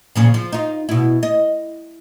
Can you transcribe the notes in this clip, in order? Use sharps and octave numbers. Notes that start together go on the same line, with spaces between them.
A#2 C#3 F3
F3
D#4 F4
B2 E4
D#5